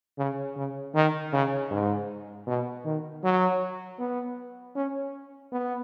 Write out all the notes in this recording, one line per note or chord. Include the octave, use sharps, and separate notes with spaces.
C#3
C#3
D#3
C#3
G#2
B2
D#3
F#3
B3
C#4
B3